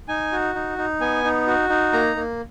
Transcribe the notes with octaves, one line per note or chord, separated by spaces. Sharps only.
D#4 G#5
F#4
D#4
D#4
B3 G#5
D#4
F#4
D#4
A#3 A#5
A#3